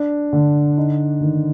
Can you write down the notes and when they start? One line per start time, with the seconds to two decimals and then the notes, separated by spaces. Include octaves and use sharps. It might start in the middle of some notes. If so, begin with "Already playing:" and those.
Already playing: D4
0.33 D3
0.78 D#4
1.21 D#3